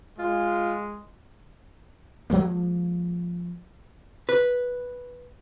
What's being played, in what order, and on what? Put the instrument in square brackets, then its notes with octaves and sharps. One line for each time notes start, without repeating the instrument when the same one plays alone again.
[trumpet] G#3 [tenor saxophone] F4
[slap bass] F3 F#3 G#3 A#3
[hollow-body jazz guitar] B4